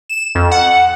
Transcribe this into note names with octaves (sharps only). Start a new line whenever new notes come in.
E7
F2
F#5